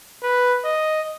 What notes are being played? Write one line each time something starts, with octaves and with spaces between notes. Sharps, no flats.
B4
D#5